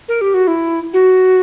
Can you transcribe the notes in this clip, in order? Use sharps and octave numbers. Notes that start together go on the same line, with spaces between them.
A#4
G4
F#4
E4
F#4